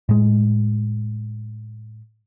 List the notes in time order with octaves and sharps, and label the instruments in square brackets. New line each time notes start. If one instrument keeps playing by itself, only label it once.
[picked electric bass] A2 G#3